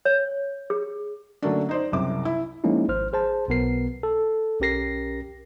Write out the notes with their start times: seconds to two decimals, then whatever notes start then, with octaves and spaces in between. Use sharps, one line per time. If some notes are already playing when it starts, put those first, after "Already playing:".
0.05 C#5
0.70 G#4
1.42 D3 F#3 A3 A#3 C#4 D4
1.69 D#4 C5 D5
1.92 F#1 C2 F#2 C3 D6
2.25 E4
2.64 F3 G#3 A#3 C#4 D#4 E4
2.89 G#1 C5 F6
3.13 G#4 C5 A5
3.48 B1 B2 B3 A#4 C7
4.03 A4
4.60 B1 C#4 G4 A#4 A#6 C7